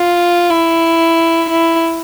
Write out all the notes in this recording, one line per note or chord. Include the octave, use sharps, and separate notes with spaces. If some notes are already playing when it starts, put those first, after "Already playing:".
Already playing: F4
E4
E4